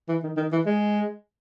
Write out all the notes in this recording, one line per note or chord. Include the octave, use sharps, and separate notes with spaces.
E3
D#3
D#3
E3
G#3